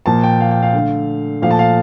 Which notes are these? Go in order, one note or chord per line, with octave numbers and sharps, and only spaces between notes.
A#2 F3 A#3 A5
G5
F5
G5
F5
D3 A3
A#2 F3 A3 F5
A5
F5